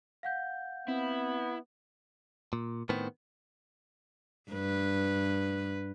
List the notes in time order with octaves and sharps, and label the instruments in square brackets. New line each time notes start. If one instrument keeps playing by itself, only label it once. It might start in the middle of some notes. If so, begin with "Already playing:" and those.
[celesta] F5 F#5 G6
[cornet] B3 [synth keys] C4 [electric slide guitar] E4
[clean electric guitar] A#2
A2 D#3 B3 C4
[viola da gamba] G2 B4